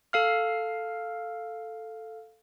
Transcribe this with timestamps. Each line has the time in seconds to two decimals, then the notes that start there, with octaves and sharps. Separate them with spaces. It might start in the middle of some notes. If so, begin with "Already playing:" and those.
0.13 A4 F5 F6